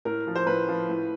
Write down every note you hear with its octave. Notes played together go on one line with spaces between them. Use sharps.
A2 A#4
F3
C5
A2 B4
F3
A2